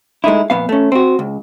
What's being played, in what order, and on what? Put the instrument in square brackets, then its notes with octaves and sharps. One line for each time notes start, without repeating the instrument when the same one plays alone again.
[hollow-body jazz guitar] G#3 A3 D#4 E4
F2 A#2 B3 F5
A3 C#4
C4 F#4
C#2